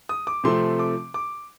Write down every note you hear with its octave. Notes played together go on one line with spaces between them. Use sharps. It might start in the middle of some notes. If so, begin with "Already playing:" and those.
D#6
D6
C3 F3 A3 C4 C6
D6
D6